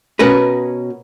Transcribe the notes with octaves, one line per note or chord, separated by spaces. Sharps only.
B2 C#4 A#4 B4